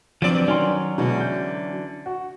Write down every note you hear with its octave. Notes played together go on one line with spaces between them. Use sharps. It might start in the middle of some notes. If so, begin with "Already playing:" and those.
G2 F3 F#3 C4 D5 D7
D#3 F#3 C#4 C6
B2 D3 E3 G#3
G6
F#4